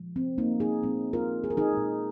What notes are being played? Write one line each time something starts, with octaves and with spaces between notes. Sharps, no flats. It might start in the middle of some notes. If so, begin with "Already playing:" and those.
Already playing: A#2 F3 G#3
C4
A#3 D#4
D#4 G#4
A#2 G#3 C4
F4 A#4
G#4
A#4
D#4 G#4
A#2 G#3